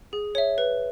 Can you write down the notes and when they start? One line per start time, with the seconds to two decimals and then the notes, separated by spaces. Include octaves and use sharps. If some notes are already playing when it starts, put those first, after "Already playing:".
0.13 G#4
0.35 C#5 E5
0.58 B4